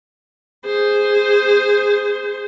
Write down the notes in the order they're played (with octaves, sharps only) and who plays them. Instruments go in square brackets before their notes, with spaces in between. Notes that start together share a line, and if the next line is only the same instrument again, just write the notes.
[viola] G#4 C5